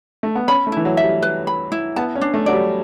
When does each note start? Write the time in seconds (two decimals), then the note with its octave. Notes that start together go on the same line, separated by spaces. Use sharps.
0.23 A3
0.35 B3
0.48 C#4 B5
0.67 A3
0.72 E3 E4
0.85 F#3
0.97 E5
1.03 G3
1.22 B4
1.47 B5
1.72 E4
1.96 B3 A5
2.15 C#4
2.21 D4
2.34 A3
2.46 F#3 D5
2.53 G3